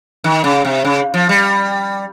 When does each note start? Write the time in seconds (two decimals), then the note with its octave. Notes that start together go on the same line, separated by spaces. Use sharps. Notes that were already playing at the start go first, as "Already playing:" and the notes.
0.24 D#3
0.44 C#3
0.65 C3
0.85 C#3
1.14 F3
1.29 G3